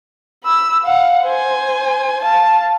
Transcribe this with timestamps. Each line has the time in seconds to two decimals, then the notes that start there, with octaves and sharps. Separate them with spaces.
0.45 B5 E6
0.84 F5 F#5
1.24 C5 G#5
2.22 F5 A5